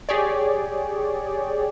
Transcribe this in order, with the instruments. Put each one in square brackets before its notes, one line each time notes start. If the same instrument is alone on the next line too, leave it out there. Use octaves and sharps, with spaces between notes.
[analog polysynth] G4 G#4 C#5 D5